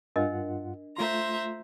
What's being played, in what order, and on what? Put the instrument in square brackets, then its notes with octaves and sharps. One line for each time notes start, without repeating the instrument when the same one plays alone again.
[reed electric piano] G2 F4 F#5 [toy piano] D4 A#4 D#5
[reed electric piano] A3 F4 C6 [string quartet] C5 E5 A#5